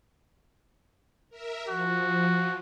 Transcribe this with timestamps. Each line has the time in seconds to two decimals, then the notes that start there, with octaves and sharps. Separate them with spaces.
1.30 A#4 E5
1.68 F3 F#4